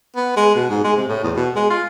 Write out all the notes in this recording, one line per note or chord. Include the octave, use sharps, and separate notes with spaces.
B3
G#3
B2
G#2
G#3
C3
A2
E2
B2
G#3
F4